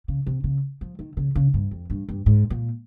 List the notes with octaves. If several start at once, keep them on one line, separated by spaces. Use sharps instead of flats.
C#3
C3
C#3
F3
D#3
C#3
C#3
G2
F2
G2
G2
G#2
A#2